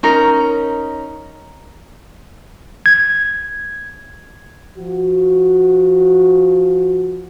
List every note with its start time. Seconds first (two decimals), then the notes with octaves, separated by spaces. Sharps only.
0.03 C#4 D#4 A#4
2.86 G#6
4.77 F3 F#4